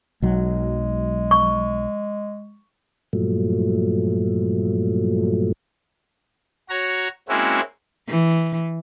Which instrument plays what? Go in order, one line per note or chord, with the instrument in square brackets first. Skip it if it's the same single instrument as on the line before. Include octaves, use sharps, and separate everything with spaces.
[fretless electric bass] B1 F#3 [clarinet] G#3
[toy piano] C#6
[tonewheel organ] G2 A#2 F3 F#3 A3
[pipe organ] F#4 C#5 A#5
G#3 A#3 C4 C#4 E4 F#4
[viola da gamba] E3